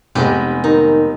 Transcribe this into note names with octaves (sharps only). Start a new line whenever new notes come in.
F1 G#3 B3 G4
D#3 D#4